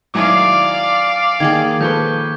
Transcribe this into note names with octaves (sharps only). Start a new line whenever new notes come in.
D#3 F#3 E4 D5 F5 G#5 D6
D#3 A#3 G#4 G#6
F3 A4 B4 C#6 G6